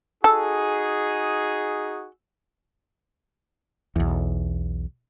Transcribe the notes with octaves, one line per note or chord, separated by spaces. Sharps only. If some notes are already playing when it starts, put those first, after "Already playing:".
D#4 F#4 G#4 A4
B1 E2